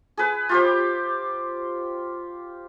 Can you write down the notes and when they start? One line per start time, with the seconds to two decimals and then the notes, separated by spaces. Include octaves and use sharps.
0.17 G#4 B4
0.49 F4 G4 C5